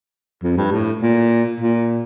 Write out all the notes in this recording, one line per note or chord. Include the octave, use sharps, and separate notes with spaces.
F2
G2
A2
A#2
A#2